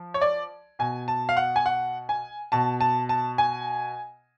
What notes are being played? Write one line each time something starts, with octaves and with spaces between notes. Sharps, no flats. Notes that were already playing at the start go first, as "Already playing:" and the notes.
Already playing: F3
C#5
D5
B2 G#5
A5
F5
F#5
G#5
F#5
G#5
B2 A5
A5
A5
G#5